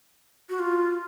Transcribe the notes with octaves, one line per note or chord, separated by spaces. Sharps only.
F#4
F4